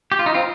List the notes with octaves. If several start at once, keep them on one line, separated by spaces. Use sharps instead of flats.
G4
F4
D#4
C4 F4